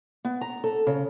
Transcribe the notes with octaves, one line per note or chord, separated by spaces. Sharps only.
B3
A#5
A4
C#3